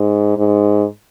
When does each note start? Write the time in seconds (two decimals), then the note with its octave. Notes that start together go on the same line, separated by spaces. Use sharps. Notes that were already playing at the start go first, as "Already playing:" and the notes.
Already playing: G#2
0.37 G#2